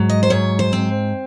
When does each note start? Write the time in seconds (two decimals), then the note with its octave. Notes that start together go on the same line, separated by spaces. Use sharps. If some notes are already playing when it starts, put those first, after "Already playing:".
Already playing: G#2 F#3
0.09 D#5
0.23 C5
0.30 G#2 C#5
0.59 C5
0.73 C4